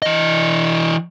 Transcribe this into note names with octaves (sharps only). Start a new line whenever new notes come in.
E3 D#5